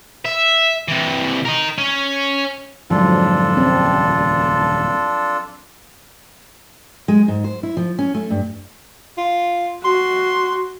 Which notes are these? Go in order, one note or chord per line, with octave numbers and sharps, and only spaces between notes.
E5
C3 E3
A#4 D#5
C#4
F2 G#2 D3 F3 F#3 D4 F4 A4
D#1 F2 C#3 C4
G#3
G#2
C5
E4
F3
C#4
A3
G2
F4
F#4 C6